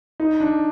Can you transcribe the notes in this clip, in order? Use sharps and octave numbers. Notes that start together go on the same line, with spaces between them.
D#4
D4